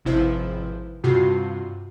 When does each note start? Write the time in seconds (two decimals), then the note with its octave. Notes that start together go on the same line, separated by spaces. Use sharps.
0.05 G#1 C3 F3 E4 B4 C5
1.04 G2 C3 F4 F#4 C7